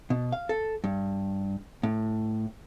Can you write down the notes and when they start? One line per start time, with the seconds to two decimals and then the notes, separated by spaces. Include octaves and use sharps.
0.10 B2
0.32 F5
0.49 A4
0.84 G2
1.83 A2